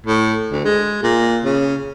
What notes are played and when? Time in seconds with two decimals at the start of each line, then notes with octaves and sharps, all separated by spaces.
0.06 A2
0.52 D2
0.65 G#3
1.03 A#2
1.44 C#3